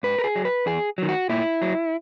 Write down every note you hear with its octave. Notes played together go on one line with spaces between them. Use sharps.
G#2 B4
A#4
G#4
F#3
B4
E2 G#4
D#3 F#3
F#4
A#2 E4
F#3